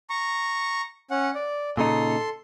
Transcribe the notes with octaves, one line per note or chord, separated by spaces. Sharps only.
A#5 C#6
C#4 F#5
D5
A#2 C#3 D#4 A4 C6